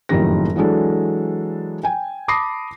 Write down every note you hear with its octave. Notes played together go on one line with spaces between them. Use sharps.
F#1 F2 A2 D#3 G4 A#6
E3 F#3 G#3 D4 A4
G5 G#5
A5 B5 D6 D#6 A#6 C7